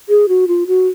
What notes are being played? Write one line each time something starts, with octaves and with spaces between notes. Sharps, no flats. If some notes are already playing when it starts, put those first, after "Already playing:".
G#4
F#4
F4
F#4